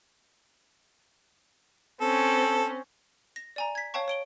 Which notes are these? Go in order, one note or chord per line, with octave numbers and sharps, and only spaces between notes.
C4 C#4 A4
A#6
D5 G#5 A#5
G#6 B6
C#5 F5 G5 A5 C#6
C#5 D7 G7